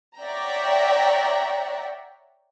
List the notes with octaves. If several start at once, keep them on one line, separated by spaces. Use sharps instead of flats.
C#5 D5 E5 F#5 G5 A#5